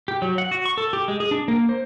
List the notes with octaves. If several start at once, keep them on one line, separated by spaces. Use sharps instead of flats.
G4
F#3
F#5
F#4
C#6
A4
G4
G#3
G#4
D4
A#3
C5